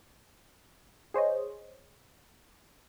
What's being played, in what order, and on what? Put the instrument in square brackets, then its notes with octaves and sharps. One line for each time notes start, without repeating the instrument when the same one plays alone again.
[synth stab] G#4 C5 C#5 D#5